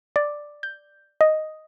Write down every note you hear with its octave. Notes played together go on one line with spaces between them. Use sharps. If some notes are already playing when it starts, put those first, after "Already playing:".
D5
G6
D#5